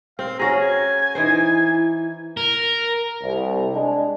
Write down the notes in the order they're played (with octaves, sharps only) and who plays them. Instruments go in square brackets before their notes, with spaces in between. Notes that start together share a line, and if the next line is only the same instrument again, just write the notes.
[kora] C4 [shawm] F5
[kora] C#4 F#4 G#4 [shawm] A#5
[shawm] G#5
[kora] E3 D#4 C5 [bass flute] E4
[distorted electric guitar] A#4
[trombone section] C2
G#3 D4